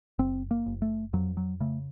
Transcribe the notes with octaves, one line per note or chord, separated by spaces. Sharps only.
F#1 C4
A#3
F#1
A3
F2 F#3
F#3
C#3 A3